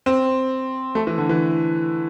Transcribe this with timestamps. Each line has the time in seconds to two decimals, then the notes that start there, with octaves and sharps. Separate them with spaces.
0.06 C4
0.95 A3
1.07 E3
1.18 D3
1.29 E3